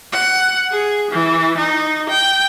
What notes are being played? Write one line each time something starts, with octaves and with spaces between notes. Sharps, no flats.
F#5
G#4
E3
D#4
G5